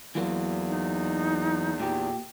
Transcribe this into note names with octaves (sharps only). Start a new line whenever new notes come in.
E2 E3 F#3 A#3
D#4
A#2 G4